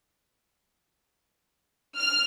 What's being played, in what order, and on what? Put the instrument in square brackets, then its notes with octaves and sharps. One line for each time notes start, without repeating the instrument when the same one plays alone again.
[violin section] F6